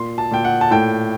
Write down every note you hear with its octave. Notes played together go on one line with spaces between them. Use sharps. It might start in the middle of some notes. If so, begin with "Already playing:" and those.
Already playing: A#2 C6
A5
A#2 G5
F#5
A5
A2 G5